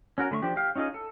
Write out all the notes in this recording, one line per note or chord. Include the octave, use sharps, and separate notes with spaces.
C#4 F#4 A#4 F#5
D3 A3 B5 C#6
F3 D4 G4
G4 F5
C#4 D#4 F4 G#4 D#5
A4